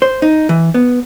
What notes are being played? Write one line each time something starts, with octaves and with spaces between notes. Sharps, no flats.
C5
D#4
E3
B3